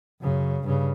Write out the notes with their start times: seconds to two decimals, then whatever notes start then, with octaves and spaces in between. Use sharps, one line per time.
0.21 F#2 C#3
0.64 G2 C#3